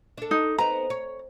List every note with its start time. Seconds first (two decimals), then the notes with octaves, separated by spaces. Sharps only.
0.18 D4 A4
0.31 D#4
0.58 B3 C4 D#4 A#5
0.90 C#5